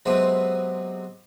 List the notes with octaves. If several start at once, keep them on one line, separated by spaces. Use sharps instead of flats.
C3 F#3 G#3 B3 C4 B4